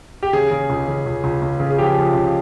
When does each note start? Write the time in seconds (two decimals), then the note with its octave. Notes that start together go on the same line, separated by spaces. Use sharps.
0.23 G4
0.33 C#3 G#4
0.51 C#3
0.70 C#2
0.88 C#3
1.06 C#2
1.24 C#2
1.42 C#2
1.60 C#3
1.70 G#4
1.78 F3 G4
1.97 F3
2.14 C#2